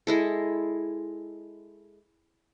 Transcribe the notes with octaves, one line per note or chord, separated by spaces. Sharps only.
G#3 E4 A4